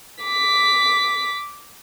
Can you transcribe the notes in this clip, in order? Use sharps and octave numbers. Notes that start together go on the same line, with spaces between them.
D6 B6